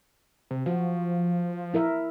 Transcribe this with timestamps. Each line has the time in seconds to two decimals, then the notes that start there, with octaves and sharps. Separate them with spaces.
0.51 C3
0.66 F3 F#4
1.74 E4 A#4 E5